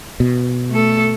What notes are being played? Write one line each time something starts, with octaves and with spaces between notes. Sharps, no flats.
B2
A3 A4